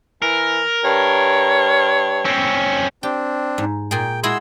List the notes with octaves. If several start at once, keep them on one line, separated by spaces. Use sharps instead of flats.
E3 A#4
G2 C#5
C4 C#4
C4 D4 G4
G#2
A#2 G#4 G5
G#3 E4 F#4 G#4 C6 E6